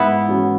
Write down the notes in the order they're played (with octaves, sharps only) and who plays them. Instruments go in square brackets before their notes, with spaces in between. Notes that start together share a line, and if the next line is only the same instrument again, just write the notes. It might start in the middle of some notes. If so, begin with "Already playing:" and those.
Already playing: [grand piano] G#2 [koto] B3 E4
[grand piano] E3 C#4 F#4